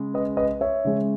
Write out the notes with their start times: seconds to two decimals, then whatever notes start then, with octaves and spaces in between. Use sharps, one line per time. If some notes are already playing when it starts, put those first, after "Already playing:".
Already playing: C#3 G#3
0.14 B4 D#5
0.37 B4 D#5
0.61 C#5 E5
0.85 C#3 G#3